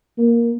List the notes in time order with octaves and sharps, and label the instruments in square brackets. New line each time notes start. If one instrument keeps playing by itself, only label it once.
[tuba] A#3